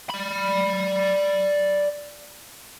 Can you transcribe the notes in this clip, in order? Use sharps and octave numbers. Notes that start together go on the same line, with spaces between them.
D5 B5